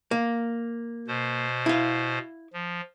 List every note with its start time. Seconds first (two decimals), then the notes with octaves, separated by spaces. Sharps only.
0.11 A#3
1.08 B2 C5
1.66 E4 F5
2.53 F3